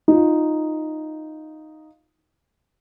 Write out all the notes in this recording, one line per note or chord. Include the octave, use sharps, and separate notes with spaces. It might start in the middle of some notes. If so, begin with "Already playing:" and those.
D#4 F4